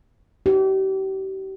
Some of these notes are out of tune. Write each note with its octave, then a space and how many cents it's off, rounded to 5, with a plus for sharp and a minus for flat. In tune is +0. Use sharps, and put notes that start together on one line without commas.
D#4 +0 G4 -35